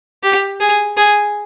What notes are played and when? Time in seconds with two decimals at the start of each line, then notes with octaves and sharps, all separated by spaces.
0.23 G4
0.60 G#4
0.97 G#4